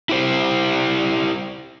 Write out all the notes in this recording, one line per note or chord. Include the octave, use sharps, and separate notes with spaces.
E4 G4 C5